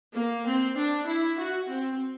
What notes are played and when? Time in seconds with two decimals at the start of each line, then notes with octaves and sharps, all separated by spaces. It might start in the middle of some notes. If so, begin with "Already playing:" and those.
0.16 A#3
0.46 C4
0.77 D4
1.07 E4
1.37 F#4
1.67 C4